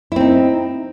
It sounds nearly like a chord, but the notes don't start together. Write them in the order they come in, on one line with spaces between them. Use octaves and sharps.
E4 C4 D#4